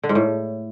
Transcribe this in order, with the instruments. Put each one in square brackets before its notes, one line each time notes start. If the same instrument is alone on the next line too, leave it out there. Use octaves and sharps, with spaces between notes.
[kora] D3
G#2
A2